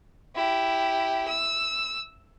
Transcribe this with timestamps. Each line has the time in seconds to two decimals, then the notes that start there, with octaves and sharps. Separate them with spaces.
0.36 E4 G4
1.28 E6